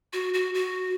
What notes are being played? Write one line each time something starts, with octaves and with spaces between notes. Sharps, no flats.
F#4
F#4
F#4